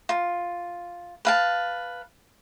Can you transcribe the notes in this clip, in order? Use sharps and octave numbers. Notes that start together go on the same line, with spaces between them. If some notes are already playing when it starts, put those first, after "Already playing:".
F4
B4 F5 A5